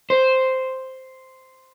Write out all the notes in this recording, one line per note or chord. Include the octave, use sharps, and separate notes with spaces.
C5